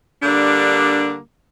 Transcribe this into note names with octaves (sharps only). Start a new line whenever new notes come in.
D3 G3 A#3 D4